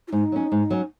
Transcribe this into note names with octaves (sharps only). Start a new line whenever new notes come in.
F4
G#2 D#4
F#3 C#4
G#2
F#3 C#4